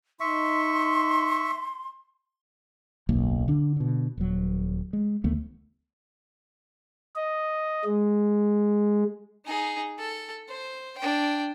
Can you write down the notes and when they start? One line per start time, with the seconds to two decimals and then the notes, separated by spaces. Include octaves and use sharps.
0.20 D#4 E5 C6 C#6
3.09 D1 B1 F#2 A#3
3.48 D3 D4
3.76 B2 D3
4.18 D#1 F#3
4.93 G#3
5.24 D2 D#3 A3 B3
7.15 D#5
7.85 G#3
9.45 D#4 G#4
9.99 A4
10.49 C5
10.98 D4 G5